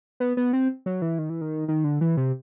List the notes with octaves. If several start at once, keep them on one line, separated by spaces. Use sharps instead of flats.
B3
B3
C4
F#3
E3
D#3
E3
D#3
D#3
D3
E3
C3